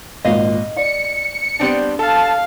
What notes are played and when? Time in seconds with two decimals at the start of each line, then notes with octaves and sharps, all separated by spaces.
0.25 G#1 A#2 D#5 F5
0.76 D5 C#7
1.60 G3 B3 C4 D4
1.99 A4 F5 A5